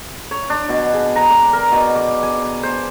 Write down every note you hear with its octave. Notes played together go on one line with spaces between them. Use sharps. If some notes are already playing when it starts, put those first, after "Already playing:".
C#5
D4
B2
G#4
A#5
D5
A#4
B2
D6
G#5
C5